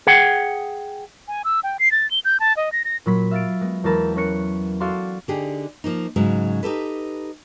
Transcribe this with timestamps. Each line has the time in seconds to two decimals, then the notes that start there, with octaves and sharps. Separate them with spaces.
0.07 G#4 F#5 G5
1.28 G#5
1.44 E6
1.64 G5
1.79 C7
1.92 A6
2.11 G7
2.25 G6
2.40 A5
2.57 D#5
2.72 A#6
2.85 A#6
3.06 A#2 F#3 B5 B6
3.31 E5 F5 A6 D7
3.61 G#3 B3
3.84 E2 F#3 G#3 A#4 A5 B5
4.16 C#4 A#4 C#5 F#6 C#7
4.80 F#4 A4 D5 F5 C6
5.28 D3 D4 D#4 G4 G#4
5.84 F3 A#3 D#4
6.16 G#2 C#3 F#3 G#3
6.63 D#4 G4 A4 B4